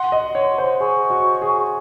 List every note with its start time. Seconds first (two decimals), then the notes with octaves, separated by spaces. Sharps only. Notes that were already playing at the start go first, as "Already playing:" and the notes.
Already playing: F#5 C6
0.12 D#5
0.35 C#5
0.58 C5
0.80 G#4 C#6
1.10 F#4
1.42 G#4